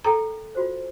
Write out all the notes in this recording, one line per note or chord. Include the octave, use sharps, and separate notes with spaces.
A4 A#4 G5 A#5
F4 F#4 C5